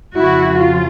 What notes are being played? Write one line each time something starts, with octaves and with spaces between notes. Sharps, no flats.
F2 C#3 F3 E4 F#4
F4